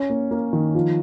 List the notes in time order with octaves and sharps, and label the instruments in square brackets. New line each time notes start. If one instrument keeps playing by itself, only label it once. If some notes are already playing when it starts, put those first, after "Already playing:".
Already playing: [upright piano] C#4
A#3
A#3
D#3
F3